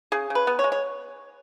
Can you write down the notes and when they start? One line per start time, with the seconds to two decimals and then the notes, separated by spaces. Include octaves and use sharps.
0.12 C#3 G#4
0.30 C#3
0.35 B4
0.47 B3
0.59 C#5
0.64 G#3
0.72 C#5